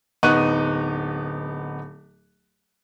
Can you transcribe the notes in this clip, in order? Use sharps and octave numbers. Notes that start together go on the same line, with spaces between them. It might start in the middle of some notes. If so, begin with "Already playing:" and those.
D1 B3 D#4 C#6 F#6 D#7